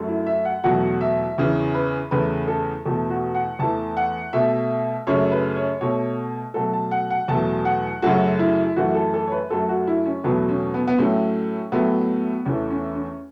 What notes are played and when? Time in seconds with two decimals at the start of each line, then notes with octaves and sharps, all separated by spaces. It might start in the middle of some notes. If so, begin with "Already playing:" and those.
Already playing: F#2 F#3 A3
0.08 E4
0.27 E5
0.45 F#5
0.64 E2 B2 F#3 A3 F#5
1.01 E5
1.38 E2 C#3 E3
1.74 B4
2.11 E2 C#3 A3 B4
2.48 A4
2.85 E2 B2 A3 A4
3.10 F#4
3.35 F#5
3.59 E2 E3 A3 A5
3.97 F#5
4.33 B2 A3 E5
5.07 F#2 C#3 A3 C#5
5.32 B4
5.56 C#5
5.81 B2 A3 C#5
6.54 B2 F#3 A3 A4
6.73 A5
6.91 F#5
7.10 F#5
7.28 E2 B2 F#3 A3 A5
7.65 F#5
8.02 F#2 C#3 F#3 A3 F#4
8.39 E4
8.76 F#2 E3 A3 F#4
8.95 A4
9.14 A4
9.27 C#5
9.32 B4
9.50 F#2 F#3 A3 A4
9.69 F#4
9.87 E4
10.06 C#4
10.24 E2 B2 F#3 A3 B3
10.49 C#4
10.74 B3
10.87 B3
10.98 A2 F#3 A3 C#4
11.72 A2 F#3 A3 B3
12.45 E2 E3 A3 C#4
12.71 C#4
12.95 C#4